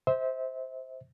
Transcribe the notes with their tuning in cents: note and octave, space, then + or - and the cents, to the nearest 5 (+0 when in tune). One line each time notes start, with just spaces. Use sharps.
C5 +0 E5 -35